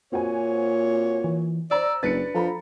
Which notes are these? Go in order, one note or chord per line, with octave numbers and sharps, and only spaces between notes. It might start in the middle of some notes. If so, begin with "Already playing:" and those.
A#2 C4 F#4 C#5 G#5
E3
C5 D5 A#5 E6
F#1 D4 B4 A6 C#7
F3 A4 A#5 B5